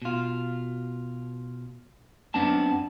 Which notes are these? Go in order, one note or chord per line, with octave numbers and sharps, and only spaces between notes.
B2 F4
F#2 B3 C4 D4 A5